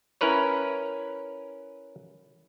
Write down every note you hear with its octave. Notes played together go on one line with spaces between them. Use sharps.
C#4 E4 A#4 B4 C#5